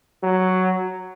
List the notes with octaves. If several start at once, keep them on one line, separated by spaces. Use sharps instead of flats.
F#3